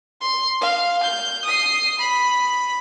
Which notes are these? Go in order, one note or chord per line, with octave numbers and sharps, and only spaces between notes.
C6
F5
G6
D#6 C7
B5